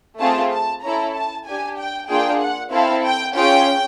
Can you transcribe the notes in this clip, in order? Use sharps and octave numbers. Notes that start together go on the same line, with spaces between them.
A3 C4 F4 G#4 A5
A5
C#4 E4 A4 A#5
A5
D4 G4 G#5
G5
A#3 D4 F4 G#4 G5
F#5
C4 E4 A4 F5
G5
C#4 F4 G#4 G5